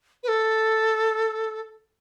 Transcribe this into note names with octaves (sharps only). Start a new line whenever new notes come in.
B4
A4